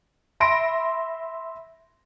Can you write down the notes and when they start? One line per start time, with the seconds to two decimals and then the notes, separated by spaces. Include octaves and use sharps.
0.40 E5 B5 C6 A#6 D7